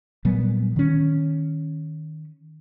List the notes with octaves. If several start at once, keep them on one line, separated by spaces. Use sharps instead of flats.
A#2 F#3 G3 B3
D#3 C#4